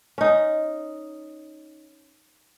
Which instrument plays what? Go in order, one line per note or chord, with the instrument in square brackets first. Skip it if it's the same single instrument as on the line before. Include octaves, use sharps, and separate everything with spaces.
[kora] C#4 D#4